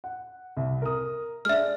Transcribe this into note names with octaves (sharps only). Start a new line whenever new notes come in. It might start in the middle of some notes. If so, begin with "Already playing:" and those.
F#5
C2
A#4 D#6
G#3 D4 E5 F6